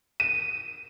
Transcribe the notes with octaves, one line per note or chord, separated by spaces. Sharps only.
D#7